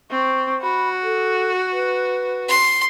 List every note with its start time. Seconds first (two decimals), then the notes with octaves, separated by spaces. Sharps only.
0.11 C4 C#6
0.62 F#4 B5
1.03 A4
1.72 B4
2.48 C6